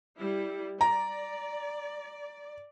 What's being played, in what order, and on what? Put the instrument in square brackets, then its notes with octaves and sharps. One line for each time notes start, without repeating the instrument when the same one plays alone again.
[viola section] G3 E4
[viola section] D5 [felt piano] A#5